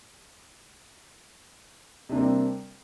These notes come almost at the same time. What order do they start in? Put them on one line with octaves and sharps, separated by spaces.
C3 D4 A#3 C4 G3